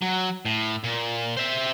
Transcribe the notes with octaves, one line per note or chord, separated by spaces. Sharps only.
F#3
A2
A#2
C5 E5